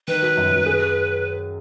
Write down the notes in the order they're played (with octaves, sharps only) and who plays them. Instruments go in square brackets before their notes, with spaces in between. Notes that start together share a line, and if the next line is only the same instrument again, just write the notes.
[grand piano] D#3 [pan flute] B4
[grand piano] F#3
F#2
F#2
G#4